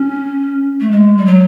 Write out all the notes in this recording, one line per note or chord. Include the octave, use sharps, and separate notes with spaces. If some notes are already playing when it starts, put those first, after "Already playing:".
Already playing: C#4
A3
G#3
G3
F#3